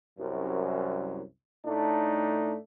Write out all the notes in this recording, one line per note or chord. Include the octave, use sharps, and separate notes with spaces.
C2 F#2
A2 A3 D4 D#4